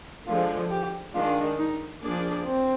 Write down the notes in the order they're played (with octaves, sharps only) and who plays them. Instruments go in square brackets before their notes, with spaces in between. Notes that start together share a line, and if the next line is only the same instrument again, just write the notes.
[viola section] D3 F3 G#3 [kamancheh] F4
[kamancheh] G4
[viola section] D#3 G#3 D4 [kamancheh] F4
[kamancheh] D#4
[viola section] F3 A#3 D4 G#4 D5
[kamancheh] C4